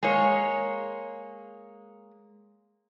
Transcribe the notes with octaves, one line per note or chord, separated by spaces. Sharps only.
G#3 A#3 C#5